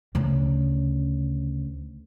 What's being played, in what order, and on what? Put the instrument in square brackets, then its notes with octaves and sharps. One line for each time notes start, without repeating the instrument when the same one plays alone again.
[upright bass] D2 C#3